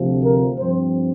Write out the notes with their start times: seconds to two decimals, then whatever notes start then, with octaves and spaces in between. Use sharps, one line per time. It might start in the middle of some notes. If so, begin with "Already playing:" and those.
Already playing: D2 C3 F3 C4
0.23 A#4
0.58 G2 F3 C4 C5